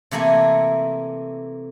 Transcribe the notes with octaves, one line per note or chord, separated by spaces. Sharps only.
C3 E3 A3 A#3 G#5